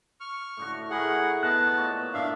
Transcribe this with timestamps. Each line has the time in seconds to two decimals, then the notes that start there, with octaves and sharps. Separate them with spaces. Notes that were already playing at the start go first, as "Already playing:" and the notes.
0.20 C#6 F6
0.57 A2 D3 F#4
0.91 A2 E4 G#4 A#4 F#5
1.43 B3 D#5 A5 F#6
1.76 A#2 C#5 D#5
2.14 A2 D4 E5 F5